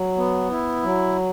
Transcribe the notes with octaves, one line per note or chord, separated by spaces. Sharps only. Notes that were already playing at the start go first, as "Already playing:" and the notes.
Already playing: F#3
B3
E4
F#3